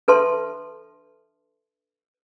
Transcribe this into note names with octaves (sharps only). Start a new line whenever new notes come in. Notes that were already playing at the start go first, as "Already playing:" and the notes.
D4 A4 B4 E5 A5 C6